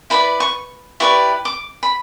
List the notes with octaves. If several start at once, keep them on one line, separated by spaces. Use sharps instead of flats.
E4 B4 D5 B5
C#6
E4 G4 B4 D5 C#6
D6
B5